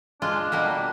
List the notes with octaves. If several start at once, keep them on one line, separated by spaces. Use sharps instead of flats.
G#3 D4 F4
B2 G3 A#3